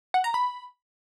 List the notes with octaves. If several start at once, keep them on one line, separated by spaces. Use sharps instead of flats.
F#5
A#5
B5